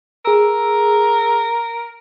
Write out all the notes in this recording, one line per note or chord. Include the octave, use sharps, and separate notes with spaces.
G#4 A#4 E6